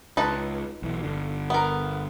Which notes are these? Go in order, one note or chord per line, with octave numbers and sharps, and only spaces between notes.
C#2 D#4 B4 A5
B1 E3
G1 D3
B3 A#4